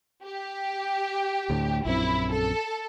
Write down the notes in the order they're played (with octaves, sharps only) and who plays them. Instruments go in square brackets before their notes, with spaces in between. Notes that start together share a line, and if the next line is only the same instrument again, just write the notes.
[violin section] G4
[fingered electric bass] D2 A2 D3
[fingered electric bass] A#1 F#2 C4 [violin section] E4
[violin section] A4